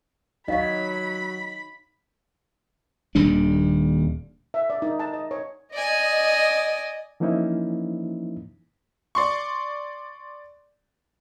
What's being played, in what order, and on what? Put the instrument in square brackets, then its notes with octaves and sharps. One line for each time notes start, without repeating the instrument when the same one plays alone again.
[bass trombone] F#3 [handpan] D#4 C#5 [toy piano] D#5 F5 [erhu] B5
[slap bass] D#1 D#2 G3 D4
[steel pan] E5
D5
D#4
A5
D#5
C#5
[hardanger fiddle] D5 G#5 [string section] D#5
[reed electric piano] E3 F3 A#3 C#4 D#4 E4
[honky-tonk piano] D5 C6 C#6